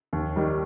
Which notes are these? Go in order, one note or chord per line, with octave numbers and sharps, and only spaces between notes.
D#2
D#3 G3